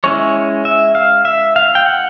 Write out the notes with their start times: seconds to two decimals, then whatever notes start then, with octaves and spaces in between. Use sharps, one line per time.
0.04 G#3 C#4 E4 C#5
0.65 E5
0.95 F5
1.25 E5
1.56 F5
1.75 G5
1.86 F#5